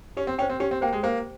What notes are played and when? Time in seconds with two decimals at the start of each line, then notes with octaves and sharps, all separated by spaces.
0.17 C#4 G4
0.27 C4
0.38 C#4 G5
0.42 C5
0.50 C4
0.60 C#4 G4
0.71 C4
0.81 A#3 C5 G5
0.93 G#3
1.03 A#3 C5